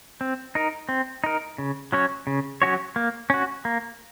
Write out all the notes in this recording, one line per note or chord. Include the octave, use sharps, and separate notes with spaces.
C4
D#4 A#4
C4
D#4 A#4
C#3
F#3 C#4 F#4 C#5
C#3
F#3 C#4 F#4 C#5
A#3
C#4 F#4
A#3